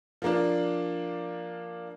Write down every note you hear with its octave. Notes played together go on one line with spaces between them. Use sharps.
F3 A#3 D4